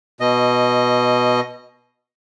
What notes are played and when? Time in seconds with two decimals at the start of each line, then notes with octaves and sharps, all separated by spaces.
0.20 B2 D#5